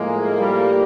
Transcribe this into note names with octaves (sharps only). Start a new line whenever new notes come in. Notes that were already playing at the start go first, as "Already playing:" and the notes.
Already playing: A2 F3 G#3 A#3
G3